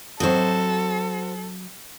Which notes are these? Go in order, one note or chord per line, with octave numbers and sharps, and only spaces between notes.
F#3 C4 F#4 A4 C5 D#5